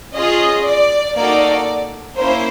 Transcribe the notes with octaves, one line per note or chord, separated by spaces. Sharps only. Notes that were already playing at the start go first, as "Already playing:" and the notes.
C#4 F4 G#4 D#5
D5
A#3 D#4 F#4 A4 D5
A#3 C#4 E4 C5